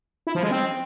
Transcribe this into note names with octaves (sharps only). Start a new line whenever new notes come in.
E4
F3
G#3
C4